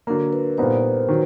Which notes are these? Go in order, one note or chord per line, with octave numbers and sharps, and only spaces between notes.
D3 F#3 A#3 A#4
B4
A#2 G3 B3 D#4 C5
D#3 F#3